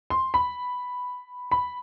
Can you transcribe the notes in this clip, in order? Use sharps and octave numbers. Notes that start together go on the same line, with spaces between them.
C6
B5
B5